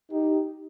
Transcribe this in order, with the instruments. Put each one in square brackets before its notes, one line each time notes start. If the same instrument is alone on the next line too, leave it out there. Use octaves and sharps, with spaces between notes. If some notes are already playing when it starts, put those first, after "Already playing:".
[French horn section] D#4 G4